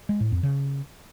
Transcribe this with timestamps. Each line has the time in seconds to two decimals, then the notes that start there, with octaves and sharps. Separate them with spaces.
0.09 G#3
0.20 A2
0.32 F2
0.43 C#3